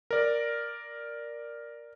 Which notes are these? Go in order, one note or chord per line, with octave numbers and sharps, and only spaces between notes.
A#4 D5